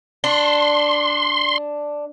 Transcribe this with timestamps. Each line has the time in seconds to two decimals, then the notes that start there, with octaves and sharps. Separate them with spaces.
0.24 D4 C6